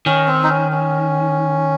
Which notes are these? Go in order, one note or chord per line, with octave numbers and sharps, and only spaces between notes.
D#3 C#4
C4
D#4
C#4
C#4